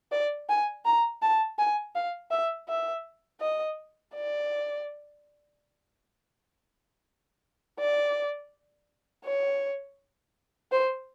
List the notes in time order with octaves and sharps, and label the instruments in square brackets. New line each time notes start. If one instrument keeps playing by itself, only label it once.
[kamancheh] D5
G#5
A#5
A5
G#5
F5
E5
E5
D#5
D5
D5
C#5
C5